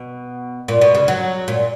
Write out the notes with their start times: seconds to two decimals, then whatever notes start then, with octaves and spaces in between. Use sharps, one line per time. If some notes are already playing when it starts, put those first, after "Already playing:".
Already playing: B2
0.68 A#2
0.81 B2
0.95 C#3
1.08 F#3
1.48 A#2